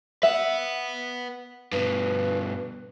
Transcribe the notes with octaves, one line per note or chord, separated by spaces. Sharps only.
B4 E5 F#5
G2 B2 B4